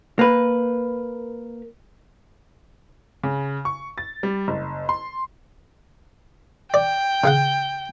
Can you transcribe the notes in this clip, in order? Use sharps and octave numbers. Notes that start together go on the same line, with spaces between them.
A#3 B4
C#3
C#6
A6
G3
F#1
C6
D5 G5
C#3 F5 F#5